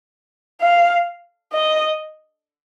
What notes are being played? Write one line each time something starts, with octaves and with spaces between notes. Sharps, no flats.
F5
D#5